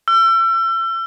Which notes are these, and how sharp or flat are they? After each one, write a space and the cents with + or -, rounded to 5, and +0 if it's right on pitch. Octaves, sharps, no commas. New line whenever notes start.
E6 +35